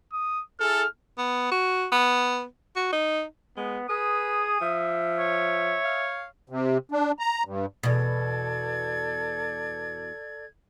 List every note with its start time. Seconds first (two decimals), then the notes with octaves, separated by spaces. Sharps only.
0.13 D#6
0.60 E4 G#4 A4 F6
1.18 B3
1.51 F#4
1.92 B3
2.76 F#4
2.93 D#4
3.57 G#3 B3
3.89 G#4 B4 D#6
4.61 F3 E5
5.19 C#5
5.84 F5
6.50 C3
6.92 D4
7.19 A#5
7.45 G2
7.83 E2 B2 A4 D5 G#6